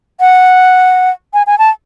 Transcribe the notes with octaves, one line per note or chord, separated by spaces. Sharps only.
F#5
G#5
G#5
A5